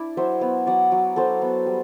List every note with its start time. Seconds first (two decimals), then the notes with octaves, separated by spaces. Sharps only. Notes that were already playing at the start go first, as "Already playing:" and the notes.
Already playing: D4 E4 D5
0.17 F#3 C5 E5
0.41 B3
0.67 F#3 D5 F#5
0.92 F#3
1.16 F#3 A4 C5
1.42 B3
1.66 G3